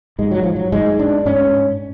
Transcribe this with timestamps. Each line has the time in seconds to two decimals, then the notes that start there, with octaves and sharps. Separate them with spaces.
0.19 G#2 G#3
0.31 F#3
0.43 F3
0.56 F#3
0.72 G#2 G#3
0.99 D4
1.26 G#2 C#4